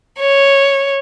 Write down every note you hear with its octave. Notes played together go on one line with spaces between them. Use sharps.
C#5